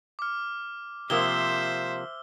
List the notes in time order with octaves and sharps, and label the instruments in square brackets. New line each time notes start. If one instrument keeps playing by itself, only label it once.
[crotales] D6 F6
[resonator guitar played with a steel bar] C3 F3 A#3 [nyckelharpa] C5 E5 [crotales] E6 G7